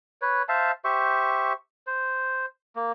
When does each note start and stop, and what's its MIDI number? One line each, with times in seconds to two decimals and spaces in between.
0.22 0.43 71
0.22 0.43 73
0.49 0.72 72
0.49 0.72 76
0.49 0.72 77
0.49 0.72 81
0.85 1.53 67
0.85 1.53 72
0.85 1.53 76
0.85 1.53 85
1.87 2.46 72
2.76 2.92 58